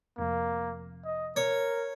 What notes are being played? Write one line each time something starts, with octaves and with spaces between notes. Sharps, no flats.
F1 F2 A#3
D#5
A#4 C#5